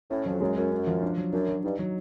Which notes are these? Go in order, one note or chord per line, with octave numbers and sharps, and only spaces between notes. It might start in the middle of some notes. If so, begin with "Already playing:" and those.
A2 C#4
F2 F#3
F#2 G#3
F#2 C#4
C#4
F3
D4
F#3
F#2 D4
F#3
G2 D#4
F#3